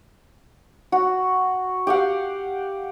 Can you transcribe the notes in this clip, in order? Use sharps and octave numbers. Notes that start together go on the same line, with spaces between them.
F#4
G4 F5 F#5